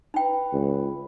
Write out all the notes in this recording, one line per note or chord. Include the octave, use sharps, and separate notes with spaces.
D#4 B4 G5 A#5
C#2